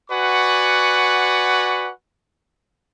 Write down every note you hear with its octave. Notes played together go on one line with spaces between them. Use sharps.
F#4 B4 D5 F#5 G#5 C#6